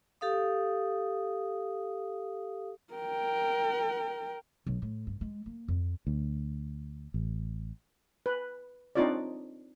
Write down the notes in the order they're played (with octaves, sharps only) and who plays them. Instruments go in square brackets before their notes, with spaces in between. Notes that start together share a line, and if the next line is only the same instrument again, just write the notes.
[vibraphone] G4 A4 F5 D#6
[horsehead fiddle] A#4 G5
[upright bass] B1 F#3
A2
G2
G#3
A#3
F2
[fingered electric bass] D2
A1
[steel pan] B4
C4 D4 D#4 F4 C#5 D5